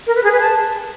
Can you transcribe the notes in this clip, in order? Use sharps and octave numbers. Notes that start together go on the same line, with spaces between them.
A#4
B4
G#4
B4
A5